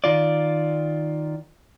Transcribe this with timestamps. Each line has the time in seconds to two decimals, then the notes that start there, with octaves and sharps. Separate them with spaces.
0.04 D#3 F4 D5